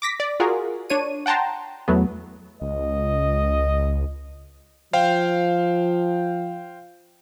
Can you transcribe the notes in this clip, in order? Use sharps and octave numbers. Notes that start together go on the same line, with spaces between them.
D6 A#6 B6
D5
F4 F#4 G#4 A#4
D4 C#5 D#7
F#5 G5 A5 A#5 C6
E2 F#3 A3 B3
C#2 D#5
F3 C5 F5 G5